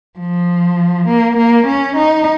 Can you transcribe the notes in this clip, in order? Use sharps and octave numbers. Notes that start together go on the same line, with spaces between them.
F3
A#3
A#3
C#4
D#4